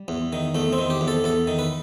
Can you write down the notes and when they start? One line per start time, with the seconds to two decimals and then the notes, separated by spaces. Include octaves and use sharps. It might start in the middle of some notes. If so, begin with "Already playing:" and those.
Already playing: G3
0.08 E2
0.33 D#3
0.55 E2 A3
0.73 C4
0.78 D#3
0.90 G4
1.01 E2
1.08 A4
1.24 E2 A4
1.47 D#3
1.59 B4